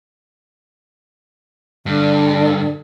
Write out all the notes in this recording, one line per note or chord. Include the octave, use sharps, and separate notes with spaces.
G2 D3